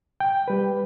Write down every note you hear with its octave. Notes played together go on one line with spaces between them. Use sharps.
G5
G3 B4